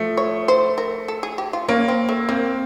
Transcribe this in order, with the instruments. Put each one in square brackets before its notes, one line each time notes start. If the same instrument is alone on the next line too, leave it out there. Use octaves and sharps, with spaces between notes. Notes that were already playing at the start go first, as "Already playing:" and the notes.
Already playing: [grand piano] F3 A3
[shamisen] C#5
C5
A#4
A4
G#4
G4
F4
[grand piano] A#3 [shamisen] C#4
[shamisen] C4
A3
[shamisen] A#3 [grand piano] C4